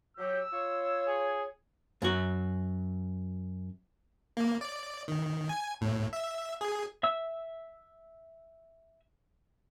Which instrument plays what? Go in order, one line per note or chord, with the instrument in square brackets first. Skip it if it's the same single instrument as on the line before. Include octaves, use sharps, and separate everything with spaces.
[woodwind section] F#3 G4 [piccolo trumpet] E6
[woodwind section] F4 C#5
[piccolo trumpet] G#4
[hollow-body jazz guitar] F#2 F#4
[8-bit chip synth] A#3
D5
D#3
G#5
A2
E5
G#4
[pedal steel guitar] E5 E6